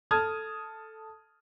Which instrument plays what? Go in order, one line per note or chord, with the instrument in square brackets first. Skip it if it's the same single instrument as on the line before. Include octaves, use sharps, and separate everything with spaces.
[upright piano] A4 A5 D#6 F6 G#6